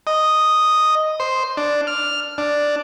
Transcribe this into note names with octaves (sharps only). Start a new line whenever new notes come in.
D#5
C5
D4
F6
D4